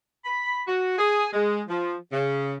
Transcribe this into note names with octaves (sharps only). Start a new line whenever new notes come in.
B5
F#4
G#4
G#3
F3
C#3